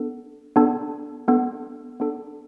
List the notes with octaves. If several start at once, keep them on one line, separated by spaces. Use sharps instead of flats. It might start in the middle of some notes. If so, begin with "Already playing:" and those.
Already playing: B3 D4 A4
B3 D4 A4
B3 D4 A4
B3 D4 A4